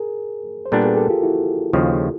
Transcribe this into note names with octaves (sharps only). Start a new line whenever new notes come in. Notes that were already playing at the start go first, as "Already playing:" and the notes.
Already playing: G#4 A#4
C5
A#2 G3 B3 D4 A4 B4
G#4 A#4
G4 A4
F4 G4
E4 F#4
D#2 C#3 F3